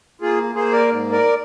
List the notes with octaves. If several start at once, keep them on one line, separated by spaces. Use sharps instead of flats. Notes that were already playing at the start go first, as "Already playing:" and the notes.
A#3 F4 G#4
A#3 G#4 C5
A#4 D5
G#2
A#4 D5